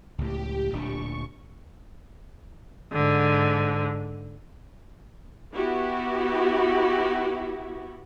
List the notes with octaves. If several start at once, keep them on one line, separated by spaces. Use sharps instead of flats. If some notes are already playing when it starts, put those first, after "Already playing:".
C#2 A2 G4
D1 A#2 D4 C#6
G#2 D3
B3 E4 F#4 G4